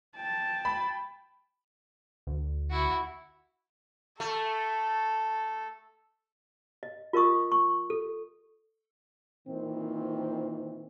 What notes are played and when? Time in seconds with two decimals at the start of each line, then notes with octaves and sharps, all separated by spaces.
0.17 G5 A5
0.65 B5
2.27 D2
2.70 E4 F#4
4.20 A3 A4
6.83 D#5
7.13 F4 A#4 D#5 C#6 D#6
7.52 C#6
7.90 A4
9.48 A#2 D#3 E3 C4